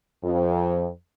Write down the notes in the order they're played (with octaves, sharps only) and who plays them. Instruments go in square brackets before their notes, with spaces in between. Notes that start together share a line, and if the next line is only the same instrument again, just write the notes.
[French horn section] F2